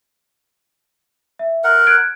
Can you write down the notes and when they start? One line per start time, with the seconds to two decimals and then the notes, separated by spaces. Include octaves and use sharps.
1.39 E5
1.64 A#4 F#5
1.87 F#6 G#6 D7